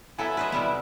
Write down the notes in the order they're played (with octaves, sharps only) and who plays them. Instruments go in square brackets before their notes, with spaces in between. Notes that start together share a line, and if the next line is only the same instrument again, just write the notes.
[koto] F#3 B3 A4 [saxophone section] E4 [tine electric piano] E5 G#5
[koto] B4 C5 D#5
C3 G3 B3